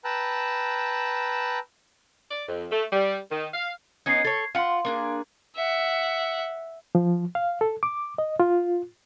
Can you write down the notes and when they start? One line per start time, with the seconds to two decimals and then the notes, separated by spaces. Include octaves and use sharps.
0.05 B4 G5 A5 A#5 E6 F#6
2.31 D5
2.48 F2
2.72 A3
2.93 G3
3.31 D#3
3.54 F5
4.06 B3 C#4 D#4 G#6 C7
4.24 A4 C#5
4.55 F4 F5 F#5 C6
4.85 A#3 D4 G#4
5.56 E5 F#5
6.95 F3
7.35 F5
7.61 A4
7.83 D6
8.18 D#5
8.40 F4